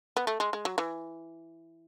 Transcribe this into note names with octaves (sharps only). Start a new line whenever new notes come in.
B3
A3
G#3
G#3
F#3
E3